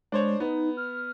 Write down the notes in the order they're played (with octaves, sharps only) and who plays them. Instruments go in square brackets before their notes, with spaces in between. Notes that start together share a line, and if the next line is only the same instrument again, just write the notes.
[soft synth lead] G#3 [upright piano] D4 C5 C#5
[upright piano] B3 [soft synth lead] D#4
[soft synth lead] F6